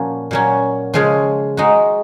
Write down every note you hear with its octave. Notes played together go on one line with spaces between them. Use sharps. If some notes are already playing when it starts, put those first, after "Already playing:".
Already playing: A#2 F3 A#3 C#4 F#4
A#2 F#3 A#3 C#4
C#3 F3 G#3 C#4 F4
G#3 D#4 F#4